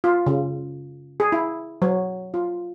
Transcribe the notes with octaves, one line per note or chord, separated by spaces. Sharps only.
F4
C#3
G#4
E4
F#3
F4